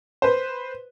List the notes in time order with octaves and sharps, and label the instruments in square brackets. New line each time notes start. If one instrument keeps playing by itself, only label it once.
[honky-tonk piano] B4 C5